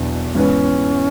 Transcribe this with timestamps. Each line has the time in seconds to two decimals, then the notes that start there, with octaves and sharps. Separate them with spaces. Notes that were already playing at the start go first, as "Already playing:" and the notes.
Already playing: E2 B2 F#3 B3 D4
0.34 G#2 E3 B3 C#4 E4 B4